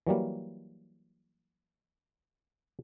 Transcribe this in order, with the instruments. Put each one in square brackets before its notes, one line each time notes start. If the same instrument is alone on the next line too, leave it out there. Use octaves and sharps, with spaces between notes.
[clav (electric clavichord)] E3 F#3 G3 A#3